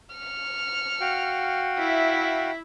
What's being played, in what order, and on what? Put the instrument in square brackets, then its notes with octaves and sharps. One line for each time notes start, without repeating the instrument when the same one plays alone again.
[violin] F6 C#7
[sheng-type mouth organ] F#4 F5 G5
[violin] E4 E5